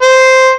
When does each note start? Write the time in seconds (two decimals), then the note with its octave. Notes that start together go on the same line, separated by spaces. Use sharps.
0.02 C5